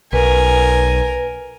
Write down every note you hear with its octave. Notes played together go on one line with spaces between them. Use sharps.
B1 A#4 B4 G#5